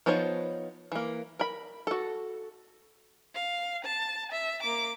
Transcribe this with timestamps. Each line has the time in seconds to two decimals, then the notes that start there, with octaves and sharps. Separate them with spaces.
0.06 F3 B3 D#4 C5 C#5
0.92 E3 A#3
1.39 A#4 B5
1.87 F#4 A4
3.35 F5
3.85 A5
4.32 E5
4.63 A#3 D6